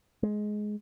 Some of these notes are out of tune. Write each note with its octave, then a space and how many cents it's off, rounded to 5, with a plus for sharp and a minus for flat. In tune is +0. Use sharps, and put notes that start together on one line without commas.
G#3 +15